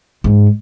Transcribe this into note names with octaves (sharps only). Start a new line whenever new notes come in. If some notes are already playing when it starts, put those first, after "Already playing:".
G#2